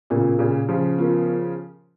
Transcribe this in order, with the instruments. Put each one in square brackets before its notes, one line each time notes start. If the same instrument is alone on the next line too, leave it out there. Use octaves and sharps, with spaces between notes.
[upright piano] A#2 C#3 [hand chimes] B3 F4 A#4
[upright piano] A#2 C#3
C#3 F3
[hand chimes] B3 F4 A#4